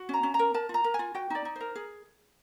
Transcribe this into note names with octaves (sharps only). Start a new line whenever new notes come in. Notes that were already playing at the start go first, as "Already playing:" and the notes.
Already playing: F#4
C#4 A#5
C#4
A#5
A#4
A#4 A5
F4
A#5
A#4
G#5
F4
F#4 G5
D#4 D5
D#4
A#4 C5
G#4